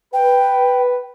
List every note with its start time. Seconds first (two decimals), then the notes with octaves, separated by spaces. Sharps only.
0.13 B4 G5